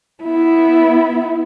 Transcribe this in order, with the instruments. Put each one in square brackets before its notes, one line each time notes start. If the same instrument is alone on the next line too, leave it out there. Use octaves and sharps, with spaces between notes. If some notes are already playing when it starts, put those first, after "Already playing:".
[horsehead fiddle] B3 E4